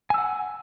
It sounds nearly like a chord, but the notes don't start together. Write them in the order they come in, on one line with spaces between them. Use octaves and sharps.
G#5 E6 F#5